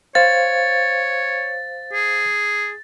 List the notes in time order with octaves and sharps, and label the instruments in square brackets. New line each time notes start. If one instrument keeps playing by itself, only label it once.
[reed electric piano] C5 F5 [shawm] C#5 [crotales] A6
[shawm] G#4